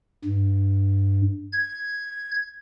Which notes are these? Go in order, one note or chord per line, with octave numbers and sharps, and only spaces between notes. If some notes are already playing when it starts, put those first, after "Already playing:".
G2
G#6